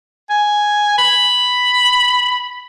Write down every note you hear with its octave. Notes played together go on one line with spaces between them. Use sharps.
G#5
B5